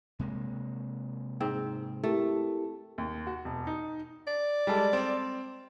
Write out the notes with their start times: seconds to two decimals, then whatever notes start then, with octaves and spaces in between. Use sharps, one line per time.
0.19 C3 G#3 A#3
1.40 G#2 C4
2.04 A3 E4 G4 A#4
2.98 D#2
3.27 F#4
3.45 E1
3.67 D#4
4.27 D5
4.67 G3 G#3 A4
4.93 C4